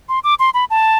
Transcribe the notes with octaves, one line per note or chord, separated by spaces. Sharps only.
C6
D6
C6
B5
A5